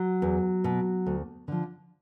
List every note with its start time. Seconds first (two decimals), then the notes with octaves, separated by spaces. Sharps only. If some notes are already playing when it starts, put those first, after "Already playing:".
Already playing: F#3
0.22 E2
0.64 B2
1.06 D2
1.48 D3 F3